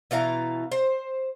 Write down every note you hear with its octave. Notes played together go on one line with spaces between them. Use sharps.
B2 E3 F5 A#5
C5